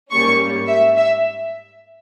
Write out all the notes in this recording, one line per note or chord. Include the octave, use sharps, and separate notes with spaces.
G#2 G3 A#3 C#4 C#6
E5
E5